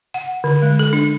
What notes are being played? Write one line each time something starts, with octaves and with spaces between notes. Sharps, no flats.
F#5
D3
G#3
A4
D4